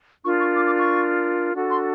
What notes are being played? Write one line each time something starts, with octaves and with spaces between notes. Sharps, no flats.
D4 F4 A#4 C#6
C#6
D6
D6
C#6
D4 F#4 A4
C6